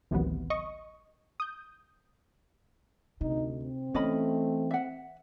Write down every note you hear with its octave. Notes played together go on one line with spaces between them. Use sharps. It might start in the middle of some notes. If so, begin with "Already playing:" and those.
A1 D2 C3 D#3 F#3 B3
D#5 C#6 D#6
D#6 G6
D2 C3 D#4
C4
E3 A3 C#4 D#5 B5
E5 F#5